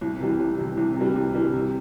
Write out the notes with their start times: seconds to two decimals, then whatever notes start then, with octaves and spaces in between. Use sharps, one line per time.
0.01 C2
0.20 C3 E3 G3
0.40 C2
0.58 C3 E3 G3
0.77 C2
0.96 C3 E3 G3
1.16 C2
1.34 C3 E3 G3
1.53 C3